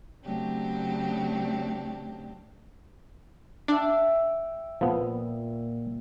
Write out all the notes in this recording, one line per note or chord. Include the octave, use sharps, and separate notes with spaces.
C#3 F#3 A3 C4 D4 G4
D4 E5 F#5 G5
A#2 F3 B3